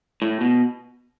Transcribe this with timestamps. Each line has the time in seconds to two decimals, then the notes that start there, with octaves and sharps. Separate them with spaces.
0.22 A2
0.41 B2